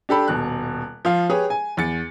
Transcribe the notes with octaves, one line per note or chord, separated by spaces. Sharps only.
D4 G4 A4 B5
D#1 B2 F#6
F3 F4 F5
G4 G#4 B4 C#5
G#5
E2 A6 C#7